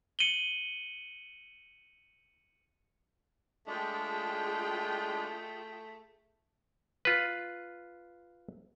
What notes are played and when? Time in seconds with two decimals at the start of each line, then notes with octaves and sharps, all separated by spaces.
0.19 C#7 D#7 F#7 G7
3.67 G#3 A3 D4 F4 G#4 G5
7.05 F4 B4